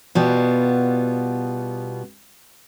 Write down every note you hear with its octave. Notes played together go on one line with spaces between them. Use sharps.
B2 G3 B3 F4